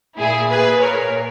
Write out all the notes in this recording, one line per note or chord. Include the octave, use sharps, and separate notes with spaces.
A#2 E4 G#4
G#4 B4
A#4 C#5